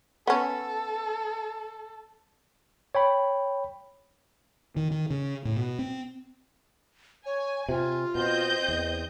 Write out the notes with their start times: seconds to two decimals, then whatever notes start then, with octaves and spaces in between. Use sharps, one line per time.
0.27 B3 C#4 A4
2.95 C#5 G5 B5
4.76 D#3
4.91 D#3
5.10 C#3
5.45 A2
5.57 B2
5.79 C4
7.26 C#5 G#5
7.69 C3 F4
8.15 B2 C4 D#5 G6
8.68 E2